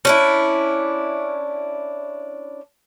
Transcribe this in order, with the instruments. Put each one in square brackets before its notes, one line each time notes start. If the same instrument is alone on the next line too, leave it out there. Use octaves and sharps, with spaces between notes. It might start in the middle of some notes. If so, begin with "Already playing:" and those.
[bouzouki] C#4 D4 E4